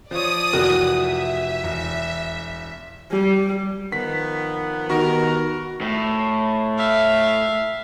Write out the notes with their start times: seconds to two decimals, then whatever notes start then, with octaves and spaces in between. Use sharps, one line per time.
0.11 F3 C#5 D5 D#6
0.53 F1 E3 F#4 A#4
0.97 E5
1.63 E1
3.11 G3
3.92 D#3 F3 B3 B6
4.90 D#3 B3 F#4 G4 A#4
5.81 A2
6.78 E5 F5